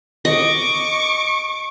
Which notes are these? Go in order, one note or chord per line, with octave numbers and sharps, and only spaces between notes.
D#5 C#6 D6